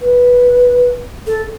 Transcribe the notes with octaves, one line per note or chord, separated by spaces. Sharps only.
B4
A4